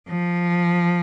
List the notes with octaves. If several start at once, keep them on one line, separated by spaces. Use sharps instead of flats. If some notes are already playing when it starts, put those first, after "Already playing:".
F3